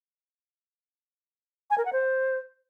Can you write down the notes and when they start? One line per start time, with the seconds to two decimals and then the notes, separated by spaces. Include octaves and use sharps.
1.70 G#5
1.78 A#4
1.85 F#5
1.93 C5